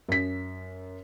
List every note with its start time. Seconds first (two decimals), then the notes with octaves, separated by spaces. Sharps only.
0.09 F#2 B6